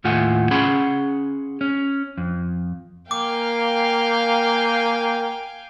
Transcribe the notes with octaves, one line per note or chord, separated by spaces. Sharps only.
D#2 A2 A3 F4 F#5 G#5
C#4 G#4 F#5 B5 C6
C#4
F2
A#3 F5 G5 G#5 D6